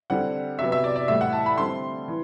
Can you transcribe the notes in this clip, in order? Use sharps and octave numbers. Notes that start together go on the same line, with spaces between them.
D3 G3 C4 F#5
C3 F#3 B3 E5
E5
D5
D5
A2 E3 G3 E5
F#5
A5
B5
D3 G3 C4 C6
E3